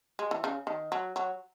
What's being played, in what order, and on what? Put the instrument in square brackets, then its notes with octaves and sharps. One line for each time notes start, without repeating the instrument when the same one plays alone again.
[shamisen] G#3
E3
C#3
D#3
F#3
F#3